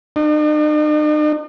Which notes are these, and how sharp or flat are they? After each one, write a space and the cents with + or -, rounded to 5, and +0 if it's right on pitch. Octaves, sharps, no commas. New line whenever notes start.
D#4 -45